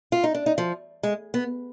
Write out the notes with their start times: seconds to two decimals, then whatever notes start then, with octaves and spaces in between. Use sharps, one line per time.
0.12 F4
0.24 D#4
0.35 D4
0.46 D#4
0.58 F3
1.03 G#3
1.34 B3